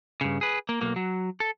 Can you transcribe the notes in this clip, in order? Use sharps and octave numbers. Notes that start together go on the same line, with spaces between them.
G2 C#3
G#4 B4
A#3
B1 A#3
F#3
A4